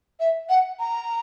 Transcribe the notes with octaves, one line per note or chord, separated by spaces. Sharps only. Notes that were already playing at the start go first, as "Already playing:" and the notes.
E5
F#5
A#5